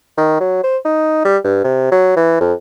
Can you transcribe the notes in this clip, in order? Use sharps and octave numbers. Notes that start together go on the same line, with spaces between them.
D#3
F#3
C5
D#4
G3
G2
C3
F#3
E3
F2